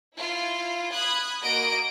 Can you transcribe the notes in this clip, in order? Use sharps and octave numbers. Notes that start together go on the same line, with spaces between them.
E4 F4
B5 D#6 F#6 G#6
A#3 F#4 A#4 D#5 D7